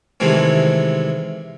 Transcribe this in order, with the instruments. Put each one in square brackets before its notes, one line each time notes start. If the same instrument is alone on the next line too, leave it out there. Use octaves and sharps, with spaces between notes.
[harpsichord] C3 D#3 E3 G#3 A3 C4